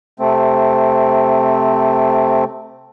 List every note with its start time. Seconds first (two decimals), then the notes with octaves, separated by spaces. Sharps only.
0.20 C3 A3 C4